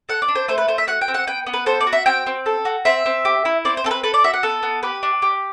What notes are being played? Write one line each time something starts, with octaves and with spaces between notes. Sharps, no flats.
A4 F#5
D5
D4
C5
A3 C5
B4
A3 C5
E5
F#4 F#5
G5
C4
F#5
B3 G5
B3
B4
A4 C5
D5
F#4
E5
C4 G5
C4
A4
F#4
C4 E5
C4
G4
E4
C4 D5
C5
C4 A4
B4
A4 B4
D5
F#4 E5
F#5
B3 A4
B3
G4 B4
D4
G4